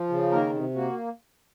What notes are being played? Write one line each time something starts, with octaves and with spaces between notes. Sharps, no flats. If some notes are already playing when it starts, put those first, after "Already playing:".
Already playing: F3
C#3
D#3 A#3 A#4
C3
A#3 F#4